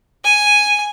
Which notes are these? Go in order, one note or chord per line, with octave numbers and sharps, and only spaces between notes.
G#5